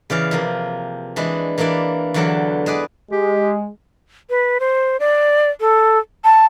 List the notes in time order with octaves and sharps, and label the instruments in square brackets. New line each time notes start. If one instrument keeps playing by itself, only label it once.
[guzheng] C#3 E3 D5 F5
C3 F3 A#3
E3 G#3 D4 E4
E3 A#3 D4 E4 D5
E2 D3 E3 F#3 A4 D5
G#3 G#4 B4 D5
[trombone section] G#3 [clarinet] G4
[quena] B4
C5
D5
A4
A5